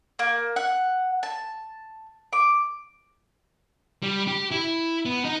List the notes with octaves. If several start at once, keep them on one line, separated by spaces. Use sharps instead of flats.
A#3
F#5
A5
D6
G3
G4
E4
B3
D#4